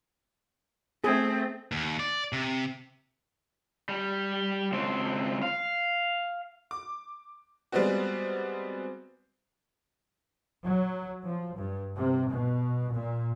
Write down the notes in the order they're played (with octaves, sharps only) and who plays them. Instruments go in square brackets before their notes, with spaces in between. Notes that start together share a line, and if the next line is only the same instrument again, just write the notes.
[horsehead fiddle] A3 C4 [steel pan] G#4
[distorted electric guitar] D#2
D5
C3
[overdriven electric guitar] G3
C#2 C4
F5
[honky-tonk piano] D6
G3 G#3 B3 C4 F#4
[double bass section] F#3
F3
G2
C3
B2
A#2